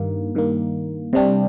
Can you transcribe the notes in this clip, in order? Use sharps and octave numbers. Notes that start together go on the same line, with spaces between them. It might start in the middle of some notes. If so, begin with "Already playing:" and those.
Already playing: G2 D#3 A#3
G2 D#3 A#3
C3 G3 D4 G4